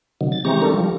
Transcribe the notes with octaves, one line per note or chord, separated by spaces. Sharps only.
C3 D#3 F#3
A6
E3 G#3 C4 G4 A#5 C#6
D4 A4 A#4
F3 G3